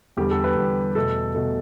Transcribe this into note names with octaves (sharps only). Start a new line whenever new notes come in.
E2 D3 G3 G4
A4
B4
E2 D3 G3
E2 B2 A3 A4
B2 A3